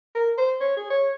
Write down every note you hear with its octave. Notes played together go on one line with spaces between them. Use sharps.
A#4
C5
C#5
G#4
C#5